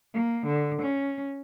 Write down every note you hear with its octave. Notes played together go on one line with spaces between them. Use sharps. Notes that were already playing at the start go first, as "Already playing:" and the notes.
A#3
D3
C#4